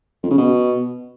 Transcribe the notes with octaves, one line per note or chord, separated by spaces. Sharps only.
F2
C#3
B2